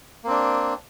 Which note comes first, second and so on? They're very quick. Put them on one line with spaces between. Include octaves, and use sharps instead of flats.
A#3 C4 D4